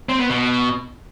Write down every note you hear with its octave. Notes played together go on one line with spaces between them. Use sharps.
C4
B3
B2